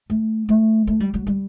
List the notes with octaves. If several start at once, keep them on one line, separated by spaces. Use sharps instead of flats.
A3
A3
A3
G3
F#3
G3